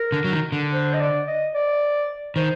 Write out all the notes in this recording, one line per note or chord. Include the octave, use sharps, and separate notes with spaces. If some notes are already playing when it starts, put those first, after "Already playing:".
Already playing: A#4
D3
F#3
D#3
D3
C5
D#5
D5
D#5
D5
D#3 C5